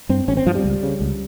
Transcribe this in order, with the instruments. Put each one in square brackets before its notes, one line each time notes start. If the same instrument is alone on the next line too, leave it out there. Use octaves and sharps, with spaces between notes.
[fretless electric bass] G2 C4
G#1 C#4
C4
G2 F3
G3
C#2
C#3
C#2